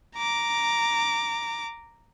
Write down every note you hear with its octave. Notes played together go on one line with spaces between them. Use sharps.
A#5 D6